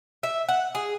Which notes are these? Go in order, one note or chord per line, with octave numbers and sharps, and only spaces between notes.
E5
F#5
G#4